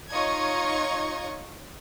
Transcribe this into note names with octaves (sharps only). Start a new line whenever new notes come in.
D#4 F4 C#5 D#5 C#6 G#6